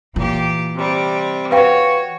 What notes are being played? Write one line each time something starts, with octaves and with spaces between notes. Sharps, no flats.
A#2 E3 G4
C3 G3
F#4 B4 C#5 F5 G5